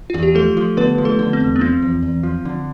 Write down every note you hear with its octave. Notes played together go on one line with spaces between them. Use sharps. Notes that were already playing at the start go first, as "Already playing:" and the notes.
E2 F4
G4
F3 A3 A4
F3
D3 B3 B4
F3
A3 A4
D3
C4
E2
B3
F3 C4
E2
E2
F3
D3